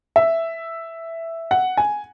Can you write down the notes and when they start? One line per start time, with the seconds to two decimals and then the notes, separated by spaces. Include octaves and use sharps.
0.16 E5
1.51 F#5
1.77 G#5